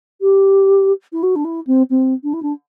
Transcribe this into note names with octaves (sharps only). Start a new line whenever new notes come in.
G4
E4
F#4
D4
E4
C4
C4
D4
E4
D4